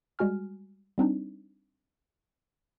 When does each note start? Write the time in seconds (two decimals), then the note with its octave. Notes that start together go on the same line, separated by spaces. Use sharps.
0.19 G3 G#3 F#4 G#5 F6
0.98 G3 C4 D4 D#4